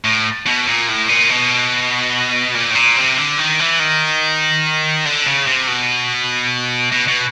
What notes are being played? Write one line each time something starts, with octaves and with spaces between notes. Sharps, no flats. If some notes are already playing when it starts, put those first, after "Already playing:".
A2
B2
A#2
A2
A#2
B2
A#2
A2
A#2
C3
D3
D#3
E3
D#3
D3
C#3
C3
B2
B2
B2